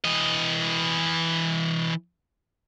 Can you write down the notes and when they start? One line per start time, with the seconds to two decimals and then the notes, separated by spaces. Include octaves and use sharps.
0.04 E3 D#5